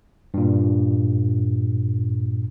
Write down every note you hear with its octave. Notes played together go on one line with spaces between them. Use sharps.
G2 A#2